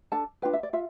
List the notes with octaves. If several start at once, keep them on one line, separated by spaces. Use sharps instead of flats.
D4 A4 A5
D4 F4 B4 G5
E5
D5
F4 E5